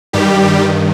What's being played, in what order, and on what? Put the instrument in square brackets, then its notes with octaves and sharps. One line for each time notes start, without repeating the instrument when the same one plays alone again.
[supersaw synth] G2 D#3 G3 G4